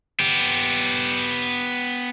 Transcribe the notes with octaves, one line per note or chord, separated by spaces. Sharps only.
B3 G4